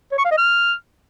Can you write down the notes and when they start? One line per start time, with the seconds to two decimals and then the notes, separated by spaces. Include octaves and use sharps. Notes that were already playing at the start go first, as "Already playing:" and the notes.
0.12 C#5
0.18 C#6
0.25 F5
0.31 D#5
0.38 F6